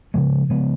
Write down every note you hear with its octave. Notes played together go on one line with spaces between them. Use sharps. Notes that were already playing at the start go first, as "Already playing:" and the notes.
C#3 F3 G#3 B3
C#3 F3 G#3 B3